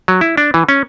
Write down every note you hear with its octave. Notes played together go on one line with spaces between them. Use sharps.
F#3
E4
D4
E3
C#4